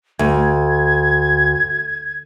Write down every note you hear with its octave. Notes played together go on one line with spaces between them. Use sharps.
D2 G#6